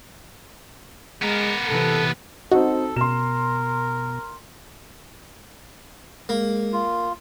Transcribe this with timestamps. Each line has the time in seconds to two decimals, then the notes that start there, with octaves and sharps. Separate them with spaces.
1.22 G#3 B3 A#4
1.68 C3 E3 A4
2.51 C4 D#4 F#4 A4
2.97 B2 A#4 C6 E7
6.29 G#3 A#3
6.73 F4